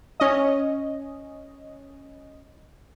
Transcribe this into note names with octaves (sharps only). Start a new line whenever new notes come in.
C#4 D#5